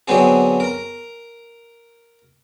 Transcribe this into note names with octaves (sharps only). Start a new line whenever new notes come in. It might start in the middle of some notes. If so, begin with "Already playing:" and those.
D3 F#3 B3 C4 G#4
A#4 A#5